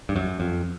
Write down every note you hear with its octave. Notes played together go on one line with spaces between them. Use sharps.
G2
F#2
F2